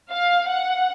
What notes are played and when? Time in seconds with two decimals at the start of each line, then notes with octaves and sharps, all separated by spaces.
0.11 F5
0.49 F#5